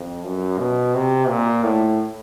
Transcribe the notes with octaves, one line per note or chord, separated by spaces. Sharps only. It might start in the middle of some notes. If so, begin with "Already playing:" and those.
Already playing: F2
F#2
B2
C3
A#2
A2